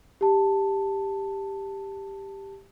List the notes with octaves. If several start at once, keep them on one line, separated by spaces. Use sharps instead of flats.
G4 A5